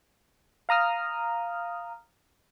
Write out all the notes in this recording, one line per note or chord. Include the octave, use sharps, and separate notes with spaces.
F5 A#5 D#6 F6